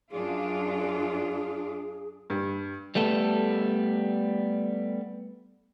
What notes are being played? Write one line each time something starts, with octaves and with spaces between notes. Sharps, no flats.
F#2 D4 F4 G#4
G2
G3 A3 B3 A4